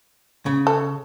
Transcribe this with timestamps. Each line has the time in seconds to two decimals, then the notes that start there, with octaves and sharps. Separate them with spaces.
0.46 C#3
0.67 A4